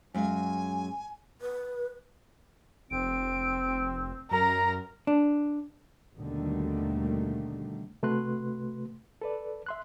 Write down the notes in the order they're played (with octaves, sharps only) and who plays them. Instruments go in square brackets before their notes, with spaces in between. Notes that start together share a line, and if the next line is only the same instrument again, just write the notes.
[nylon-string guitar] F#2 G#3 F5 [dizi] G#5
[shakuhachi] B4
[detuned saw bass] F1 [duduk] C4 [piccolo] D7
[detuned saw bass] F#2 [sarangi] A#4 [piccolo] A#5
[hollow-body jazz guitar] D4
[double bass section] D#2 B2 D3 D#3 G3 A3
[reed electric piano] C3 A3 F#4 B4 C6 F#6
A4 B4 D5
E5 C6 F#6